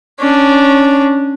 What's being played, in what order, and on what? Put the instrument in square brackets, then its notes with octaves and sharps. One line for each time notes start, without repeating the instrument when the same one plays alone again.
[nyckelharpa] C#4 D4